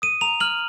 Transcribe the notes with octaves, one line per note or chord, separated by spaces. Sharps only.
D#6 D#7
A#5 F7
F6 F#7